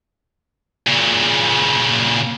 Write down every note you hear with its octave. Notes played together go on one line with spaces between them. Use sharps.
A#2 C#3